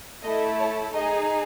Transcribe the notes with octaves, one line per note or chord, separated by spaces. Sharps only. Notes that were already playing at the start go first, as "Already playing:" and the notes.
A3 E4 A4 D#5
C#5
D#4 G#4 D#5